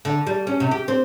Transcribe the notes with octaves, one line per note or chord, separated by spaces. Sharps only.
D3
G3
C#4
C3
G4
C4